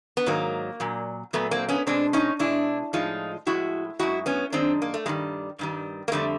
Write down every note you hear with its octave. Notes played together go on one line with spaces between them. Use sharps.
B3
G#2 D#3 F#3 A#3
A#2 F#3
A#2 F#3 A3 B3
A#3 C4
B3 C#4
B2 G#3 C4 D4
C#4 D#4
B2 G#3 D4 E4
A2 F3 G#3 D#4 F4
A2 F3 G#3 E4 F#4
F#2 D#3 G#3 E4 F#4
B3 C#4
F#2 D#3 G#3 C4 D4
A#3
A3
G2 D#3 G3 G#3
G2 D#3 G3
A#3
F2 D3 G3 A3